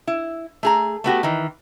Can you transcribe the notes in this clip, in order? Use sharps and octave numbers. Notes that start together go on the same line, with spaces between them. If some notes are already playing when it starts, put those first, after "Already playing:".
E4
A3 G#4 A#5
A3 B3 F#4 G4
D#3 E3